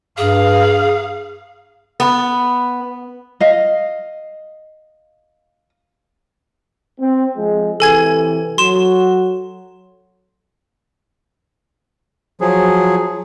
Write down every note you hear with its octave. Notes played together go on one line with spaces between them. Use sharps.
G2 G#4 F5
B3
D#5 F5
C4
F3 G#3
C3 E3 A4 G#5 G#6
F#3 C6 E7
F3 F#3 G#4